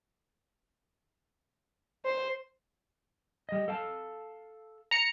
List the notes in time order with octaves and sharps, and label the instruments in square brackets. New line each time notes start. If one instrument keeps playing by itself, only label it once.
[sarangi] C5
[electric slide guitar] G3 D#5
A4 F5 A5
[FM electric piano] A#5 C#7